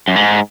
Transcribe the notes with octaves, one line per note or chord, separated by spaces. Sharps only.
F#2
G#2